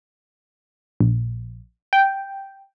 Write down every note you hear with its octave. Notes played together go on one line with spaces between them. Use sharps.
A#1
G5